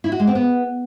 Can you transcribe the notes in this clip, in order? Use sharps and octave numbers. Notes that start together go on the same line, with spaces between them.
E4
F#4
G#3
C4
B3